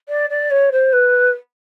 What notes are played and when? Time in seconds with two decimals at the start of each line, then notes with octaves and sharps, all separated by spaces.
0.08 D5
0.30 D5
0.50 C#5
0.72 C5
0.93 B4